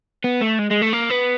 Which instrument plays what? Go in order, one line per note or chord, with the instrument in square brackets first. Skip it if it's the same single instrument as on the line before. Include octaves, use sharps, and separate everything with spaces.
[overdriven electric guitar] B3
A3
G#3
G#3
A3
A#3
B3